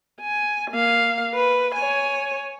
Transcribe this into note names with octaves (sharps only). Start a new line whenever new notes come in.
G#5
A#3 F5
B4
C#5 G#5